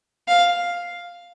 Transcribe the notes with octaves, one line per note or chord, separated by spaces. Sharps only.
F5